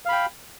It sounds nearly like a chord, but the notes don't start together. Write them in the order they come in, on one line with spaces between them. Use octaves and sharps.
F5 B5 G5